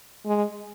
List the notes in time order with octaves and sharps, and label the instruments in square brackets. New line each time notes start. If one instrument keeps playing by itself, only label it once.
[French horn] G#3